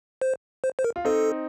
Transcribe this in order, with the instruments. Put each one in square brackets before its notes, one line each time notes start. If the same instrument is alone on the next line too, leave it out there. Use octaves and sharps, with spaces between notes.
[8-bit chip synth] C5
C5
C5
A#4
[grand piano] F4
[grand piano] C4 D#4 [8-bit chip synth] A4